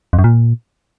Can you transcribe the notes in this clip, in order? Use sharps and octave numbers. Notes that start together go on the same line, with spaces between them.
F2
F#2
A#2